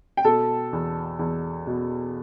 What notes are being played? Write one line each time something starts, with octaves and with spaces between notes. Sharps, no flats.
G5
B2 A4 A5
E2
E2
B2